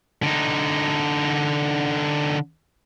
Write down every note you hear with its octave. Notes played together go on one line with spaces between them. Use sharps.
D3 D#4